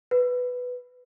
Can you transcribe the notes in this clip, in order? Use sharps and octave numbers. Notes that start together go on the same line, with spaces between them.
B4